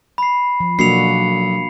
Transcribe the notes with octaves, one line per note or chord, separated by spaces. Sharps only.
B5 C7
F3
B1 A#3 D4 F#4 C7 C#7 F7